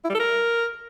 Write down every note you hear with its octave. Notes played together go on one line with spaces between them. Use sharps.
E4
G3
A4
A#4